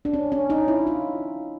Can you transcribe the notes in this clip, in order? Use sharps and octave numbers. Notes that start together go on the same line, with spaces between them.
D4
C#4
C#4
D#4
E4
F4